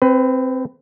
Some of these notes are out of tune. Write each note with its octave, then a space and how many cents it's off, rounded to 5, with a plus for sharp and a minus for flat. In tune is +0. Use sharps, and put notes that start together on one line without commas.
C4 +0 B4 +25